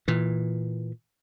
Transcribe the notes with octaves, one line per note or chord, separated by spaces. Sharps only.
A#2 E3